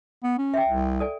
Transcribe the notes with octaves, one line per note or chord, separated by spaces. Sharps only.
B3
C#4
E5 G5
C2
A4 D5 G#5